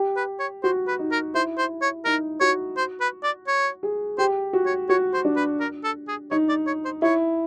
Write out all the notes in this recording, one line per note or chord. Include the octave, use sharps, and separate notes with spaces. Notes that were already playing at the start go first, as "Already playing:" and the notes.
Already playing: G4
B4
C#5
F#4 C5
B4
D#4
A#4
E4 C5
C5
C#5
D#4 A#4
F#4 C#5
C5
B4
D5
C#5
G#4
G4 C5
F#4
C#5
F#4 C#5
C5
D4
B4
A#4
A4
G#4
D#4 C#5
D5
C#5
C5
E4 C#5